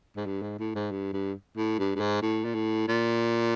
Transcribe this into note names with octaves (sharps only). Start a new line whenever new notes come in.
G#2
G2
G#2
A2
G#2
G2
G2
A2
G2
G2
G#2
A2
A#2
A2
A#2